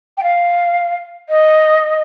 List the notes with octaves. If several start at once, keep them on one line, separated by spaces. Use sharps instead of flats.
G5
F5
D#5